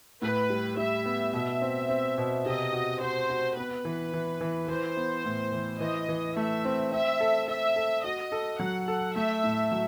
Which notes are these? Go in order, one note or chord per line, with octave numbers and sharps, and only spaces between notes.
A2 B4
G3
G3 E5
B3
B2 E5
C4
C4
B2
C3 D#5
F#4
F#4 C5
F#4
B3 B4
E3
E3
E3
E3 C5
B3
A2
E3
E3 D#5
E3
A3 E5
C4
C4 E5
A4
A4 E5
A4
F#4 D#5
A4
F#3 F#5
A4
A3 E5
A2
F#3